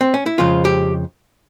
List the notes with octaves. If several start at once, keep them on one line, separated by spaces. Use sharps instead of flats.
C4
C#4
E4
F2 C#3 F3 G#3 F4
G4